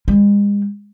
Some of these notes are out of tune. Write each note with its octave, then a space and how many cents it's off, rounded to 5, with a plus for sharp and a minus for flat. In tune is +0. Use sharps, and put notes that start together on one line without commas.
G#3 -40